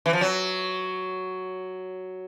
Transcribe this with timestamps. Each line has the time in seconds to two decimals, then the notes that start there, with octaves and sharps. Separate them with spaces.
0.06 E3
0.13 F3
0.21 F#3